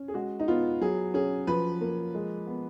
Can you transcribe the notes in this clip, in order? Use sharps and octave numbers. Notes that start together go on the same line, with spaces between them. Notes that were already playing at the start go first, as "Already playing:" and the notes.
Already playing: C#4
G#4
G#3 F#4
D#4
B3 F4
F#3 G#4
C#4 G#4
F3 B4
A#3
G#3
B3